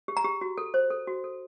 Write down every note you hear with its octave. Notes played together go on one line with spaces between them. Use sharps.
G4
A#5
G4
F#4
A4
C5
A4
F#4
A4